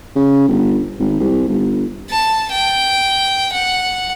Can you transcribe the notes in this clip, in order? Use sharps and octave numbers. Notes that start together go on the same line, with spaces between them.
C#3
G1
G#1
C2
G1
A5
G5
F#5